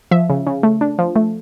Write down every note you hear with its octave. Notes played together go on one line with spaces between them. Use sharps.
F3 E5
C#3
C#3
A3
D4
F3
A3